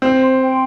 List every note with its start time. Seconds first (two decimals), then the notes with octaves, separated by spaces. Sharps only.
0.02 C4 C5
0.21 C6
0.40 G5